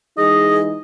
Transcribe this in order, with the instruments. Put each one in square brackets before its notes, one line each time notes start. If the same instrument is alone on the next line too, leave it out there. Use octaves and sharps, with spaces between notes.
[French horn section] E3 G#3 D#4 [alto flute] G#4 [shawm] D#5